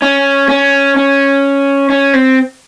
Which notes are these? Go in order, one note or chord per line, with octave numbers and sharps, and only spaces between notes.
C#4
C#4
C#4
C#4
C4